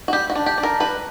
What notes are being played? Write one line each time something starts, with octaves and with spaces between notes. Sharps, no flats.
F#4
G3 G4
F#4
D4
G4
D4
A#4
G3 B4